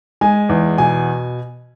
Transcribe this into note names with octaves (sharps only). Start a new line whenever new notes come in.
G#3 G#5
E2
B2 G#5